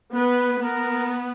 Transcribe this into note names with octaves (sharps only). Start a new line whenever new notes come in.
B3 B4
B3 A#4